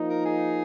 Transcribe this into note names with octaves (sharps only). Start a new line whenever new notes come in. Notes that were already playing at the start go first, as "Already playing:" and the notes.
Already playing: F3 A#3 D#4
A#4
G#4